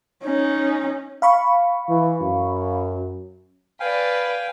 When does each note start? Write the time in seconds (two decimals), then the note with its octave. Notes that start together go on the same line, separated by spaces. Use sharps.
0.23 C#4 D#4
1.22 F5 B5 C#6
1.89 E3
2.22 F#2
3.80 B4 D5 F5 G5 G#5